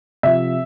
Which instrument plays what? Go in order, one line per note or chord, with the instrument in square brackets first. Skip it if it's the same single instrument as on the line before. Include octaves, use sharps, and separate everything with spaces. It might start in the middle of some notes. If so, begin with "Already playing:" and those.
[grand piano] C3 F3 E5